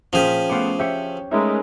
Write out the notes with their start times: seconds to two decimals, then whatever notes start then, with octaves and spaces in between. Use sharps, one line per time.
0.13 A#2 F3 C#4 G#4 G5 B6
0.50 A3 B3 C5 F5 C#6 D6
0.79 G4 C#5 E5
1.31 G#3 A3 C#4 D#4 A#4 B4 E5